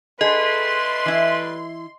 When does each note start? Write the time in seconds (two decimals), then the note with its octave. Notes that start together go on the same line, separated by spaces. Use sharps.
0.21 G3 A3 G#4 A4 B4 D#5 C6
1.06 E3 E4